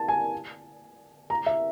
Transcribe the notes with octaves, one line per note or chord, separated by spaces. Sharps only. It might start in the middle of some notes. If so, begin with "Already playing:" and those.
Already playing: A5
G#5
A#5
E5